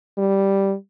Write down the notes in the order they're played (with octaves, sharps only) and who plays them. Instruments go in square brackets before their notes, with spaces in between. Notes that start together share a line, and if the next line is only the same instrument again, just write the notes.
[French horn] G3